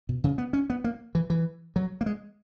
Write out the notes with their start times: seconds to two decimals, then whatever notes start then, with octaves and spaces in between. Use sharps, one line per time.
0.09 B2
0.24 C#3
0.38 B3
0.53 C#4
0.70 B3
0.84 A#3
1.15 E3
1.30 E3
1.76 F#3
2.01 A#3
2.06 G#3